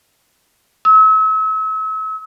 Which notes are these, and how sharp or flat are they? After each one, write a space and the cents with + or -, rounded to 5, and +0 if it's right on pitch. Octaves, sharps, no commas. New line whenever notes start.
E6 -40